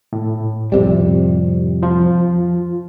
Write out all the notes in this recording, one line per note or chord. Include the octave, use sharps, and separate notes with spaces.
A2
F2 C3 G3
F3 F4